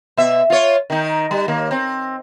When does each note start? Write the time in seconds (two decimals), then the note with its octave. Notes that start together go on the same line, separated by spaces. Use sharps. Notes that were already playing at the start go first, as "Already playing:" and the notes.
0.17 B2 E5
0.50 F4 C#5
0.90 D#3 D#4
1.31 G3
1.48 D#2 A#3
1.71 C4